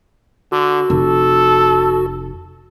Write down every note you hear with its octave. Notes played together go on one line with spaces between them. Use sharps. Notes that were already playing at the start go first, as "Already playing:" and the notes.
D3 F#4
F1 A4